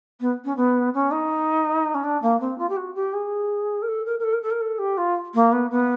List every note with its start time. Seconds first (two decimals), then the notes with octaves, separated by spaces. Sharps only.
0.21 B3
0.45 C#4
0.57 B3
0.94 C#4
1.11 D#4
1.94 C#4
2.04 D4
2.22 A#3
2.40 C4
2.58 F4
2.69 G4
2.77 F#4
2.95 G4
3.13 G#4
3.82 A#4
3.88 A4
4.06 A#4
4.20 A#4
4.23 A4
4.33 A#4
4.42 A4
4.51 A#4
4.61 A4
4.79 G4
4.98 F4
5.34 A#3
5.52 B3
5.71 B3